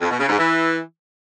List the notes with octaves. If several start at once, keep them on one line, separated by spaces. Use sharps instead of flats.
F2
B2
C#3
G#2
E3